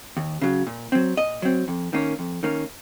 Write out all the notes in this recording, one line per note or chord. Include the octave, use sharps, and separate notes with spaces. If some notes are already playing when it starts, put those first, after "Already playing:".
D#2
C#3 F#3
A#2
F#3 C4
A#2 D#5
F#3 C4
F2
D#3 A#3 C#4
F2
D#3 A#3 C#4